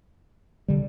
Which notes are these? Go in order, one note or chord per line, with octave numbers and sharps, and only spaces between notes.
D3 G3